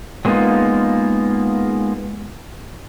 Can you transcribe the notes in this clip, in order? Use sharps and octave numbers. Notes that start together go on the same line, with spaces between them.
F#3 G#3 A#3 B3 D#4 F4